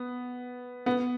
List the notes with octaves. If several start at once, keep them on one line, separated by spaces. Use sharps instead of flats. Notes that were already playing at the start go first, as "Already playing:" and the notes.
Already playing: B3
B3